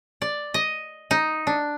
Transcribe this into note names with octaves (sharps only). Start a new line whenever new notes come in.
D5
D#5
D#4
D4